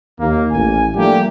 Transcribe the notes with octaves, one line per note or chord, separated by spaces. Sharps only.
D#2 A#3
A1 G#5
F3 G3 A3 A#3 D4 G4